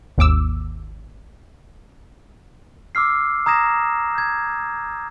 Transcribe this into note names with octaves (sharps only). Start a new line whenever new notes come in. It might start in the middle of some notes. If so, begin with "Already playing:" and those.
G#1 D#2 D6 E6
D6 E6 F6 C7
A#5 D#6 G#6 A#6 E7
G6 G#6